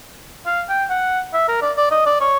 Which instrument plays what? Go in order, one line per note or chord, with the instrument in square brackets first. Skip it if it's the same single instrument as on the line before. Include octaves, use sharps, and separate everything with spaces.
[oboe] F5
G5
F#5
E5
A#4
D5
D5
D#5
D5
C#5